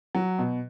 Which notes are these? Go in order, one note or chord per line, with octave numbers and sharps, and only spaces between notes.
F#3
B2